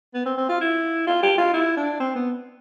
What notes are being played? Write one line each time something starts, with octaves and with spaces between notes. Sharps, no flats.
B3
C4
C4
F4
E4
F4
G4
F4
E4
D4
C4
B3